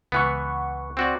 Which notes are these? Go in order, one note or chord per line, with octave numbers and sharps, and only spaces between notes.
C#2 E3 B3 F#5 C#6
C4 F#4 D5